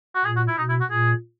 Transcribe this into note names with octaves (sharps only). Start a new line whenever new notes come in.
F#4
A#2 G#4
F#4
E4
B2 D#4
E4
F#4
A#2 G#4